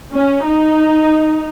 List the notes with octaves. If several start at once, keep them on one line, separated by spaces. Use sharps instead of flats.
C#4
D#4